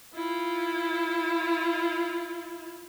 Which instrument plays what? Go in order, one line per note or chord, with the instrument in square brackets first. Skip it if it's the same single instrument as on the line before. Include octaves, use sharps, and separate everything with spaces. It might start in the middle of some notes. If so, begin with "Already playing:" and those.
[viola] E4 F4